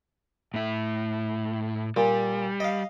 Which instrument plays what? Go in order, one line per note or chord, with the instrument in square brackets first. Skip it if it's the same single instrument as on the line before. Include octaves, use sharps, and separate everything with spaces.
[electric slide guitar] A2 E4
[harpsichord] A#2 [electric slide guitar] G3
[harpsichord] D#5 F5